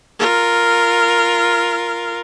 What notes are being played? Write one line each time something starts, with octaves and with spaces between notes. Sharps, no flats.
F4 A#4